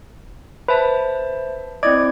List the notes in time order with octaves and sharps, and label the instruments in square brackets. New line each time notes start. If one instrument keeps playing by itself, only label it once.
[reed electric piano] B4 [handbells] C5 E5 A5
[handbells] C4 E4 G#6 [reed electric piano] D5 D#5 D6